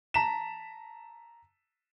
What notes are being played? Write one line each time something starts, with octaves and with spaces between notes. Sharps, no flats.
A5 A#5 B6 E7